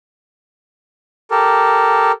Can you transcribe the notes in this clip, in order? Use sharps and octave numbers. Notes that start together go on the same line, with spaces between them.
G4 A4 A#4